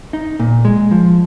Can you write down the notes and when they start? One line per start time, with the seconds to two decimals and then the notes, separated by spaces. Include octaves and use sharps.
0.13 D#4
0.40 A#2
0.65 G#3
0.91 F3